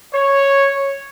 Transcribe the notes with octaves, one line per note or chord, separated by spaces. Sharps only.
C#5